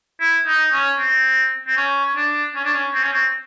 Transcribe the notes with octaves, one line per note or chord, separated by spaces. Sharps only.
E4
D#4
C#4
C4
C4
C#4
D4
C#4
D4
C#4
C4
C#4
C4